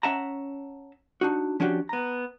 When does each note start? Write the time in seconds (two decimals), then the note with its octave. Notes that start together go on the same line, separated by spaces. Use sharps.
0.03 C#4 E5 F#5 A5 A#5
1.21 D4 D#4 F#4
1.60 F3 C#4 D4 F#4 G4
1.89 B3 A#5